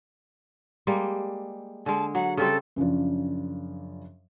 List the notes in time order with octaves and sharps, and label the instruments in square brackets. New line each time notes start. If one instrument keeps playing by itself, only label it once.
[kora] G3 G#3 A#3
[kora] D3 G#3 [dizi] A5
[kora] F#3 [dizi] F#5
[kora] C#3 G3 C4 [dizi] A4
[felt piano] F#2 C#3 F3 D4